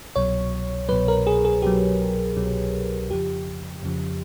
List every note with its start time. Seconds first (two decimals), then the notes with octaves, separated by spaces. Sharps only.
0.16 C2 B2 F#3 C#5
0.89 C2 B2 F#3 B4
1.08 A#4
1.27 G#4
1.45 G#4
1.62 C2 B2 F#3 G4
2.37 C2 B2 F#3
3.10 F2 C#3 F3 G4
3.83 F2 C#3 F3